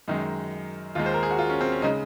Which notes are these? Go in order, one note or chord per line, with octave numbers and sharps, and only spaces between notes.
F#2 D#3 G#3 D#4
D#2 D#3 G#3 F4
C5
A#4
G#4
F#4
F4
C#4
C4
C#4
C#3 G#3 D#4